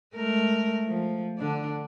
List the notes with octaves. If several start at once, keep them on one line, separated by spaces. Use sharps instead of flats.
G#3 A3 A#4
F3
D3 D4